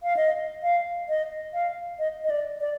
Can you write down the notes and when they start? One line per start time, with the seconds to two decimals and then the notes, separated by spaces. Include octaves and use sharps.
0.03 F5
0.17 D#5
0.63 F5
1.08 D#5
1.53 F5
1.99 D#5
2.24 D#5
2.30 D5
2.60 D5